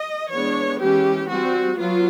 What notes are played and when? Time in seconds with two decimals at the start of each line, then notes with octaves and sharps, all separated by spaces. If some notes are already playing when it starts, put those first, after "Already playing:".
Already playing: D#5
0.30 E3 G#3 B3 D4 C#5
0.80 E3 G#3 C#4 G4
1.28 G3 C4 F#4
1.78 F#3 B3 F4